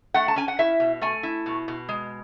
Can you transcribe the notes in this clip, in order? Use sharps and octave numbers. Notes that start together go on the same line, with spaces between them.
A3 F#5
A5
C#4 G#5
F#5
E4 E5
B2
A3 G#5
E4
B2
B2
G#3